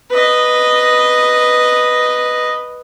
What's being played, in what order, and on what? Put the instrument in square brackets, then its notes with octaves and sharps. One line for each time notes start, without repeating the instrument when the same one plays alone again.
[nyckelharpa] B4 D#5